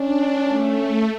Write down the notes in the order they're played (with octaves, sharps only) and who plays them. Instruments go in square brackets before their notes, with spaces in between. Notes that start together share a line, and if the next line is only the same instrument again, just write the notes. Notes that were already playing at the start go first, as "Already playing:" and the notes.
Already playing: [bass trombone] C#4 [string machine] D4
[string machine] A3